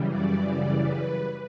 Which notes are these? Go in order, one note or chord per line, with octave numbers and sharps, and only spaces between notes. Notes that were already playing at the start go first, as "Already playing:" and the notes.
Already playing: F#2 C#3 E3 G3
D5
D5
B4